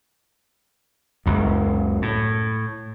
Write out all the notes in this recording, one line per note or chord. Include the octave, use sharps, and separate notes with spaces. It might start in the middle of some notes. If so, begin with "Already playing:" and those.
F#1 C#2 F#2
A2